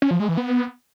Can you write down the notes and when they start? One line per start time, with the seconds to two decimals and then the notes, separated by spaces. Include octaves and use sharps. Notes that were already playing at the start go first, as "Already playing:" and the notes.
0.02 C#4
0.11 F3
0.20 G#3
0.29 E3
0.37 B3